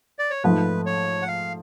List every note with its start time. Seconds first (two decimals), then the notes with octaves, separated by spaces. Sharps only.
0.19 D5
0.30 C#5
0.44 G#2 F3 A3 B4
0.86 C#5
1.22 F#5
1.28 F5